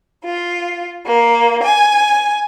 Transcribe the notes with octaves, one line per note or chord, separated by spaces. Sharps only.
F4
A#3
G#5